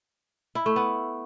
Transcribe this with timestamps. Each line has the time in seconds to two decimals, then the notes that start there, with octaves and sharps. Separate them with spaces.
0.55 E4
0.66 A3
0.76 B3